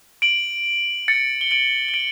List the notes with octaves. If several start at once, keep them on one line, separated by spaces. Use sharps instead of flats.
D7 F#7
A6 C#7
G7
D7 F#7
G7
D7 F#7